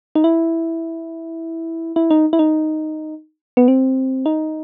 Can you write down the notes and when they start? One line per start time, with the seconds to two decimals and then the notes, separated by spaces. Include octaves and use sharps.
0.15 D#4
0.24 E4
1.96 E4
2.10 D#4
2.33 E4
2.39 D#4
3.57 B3
3.68 C4
4.26 D#4